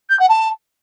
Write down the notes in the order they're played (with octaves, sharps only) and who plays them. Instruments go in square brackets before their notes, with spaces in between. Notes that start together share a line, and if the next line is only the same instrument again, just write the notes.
[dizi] G6
F#5
A5